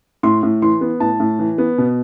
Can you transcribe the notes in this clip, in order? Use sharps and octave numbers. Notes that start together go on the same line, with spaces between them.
A2 C6
A2
E3 C6
B3
A2 A5
A2
E3
B3
B2